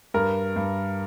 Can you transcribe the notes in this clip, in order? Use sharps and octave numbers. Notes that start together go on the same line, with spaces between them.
G2 A#4
G2